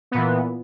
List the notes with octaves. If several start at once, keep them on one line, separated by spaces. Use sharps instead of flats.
A#2 E3 B3